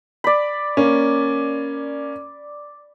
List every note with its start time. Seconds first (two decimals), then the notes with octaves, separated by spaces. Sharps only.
0.24 D5 B5
0.77 A#3 C#4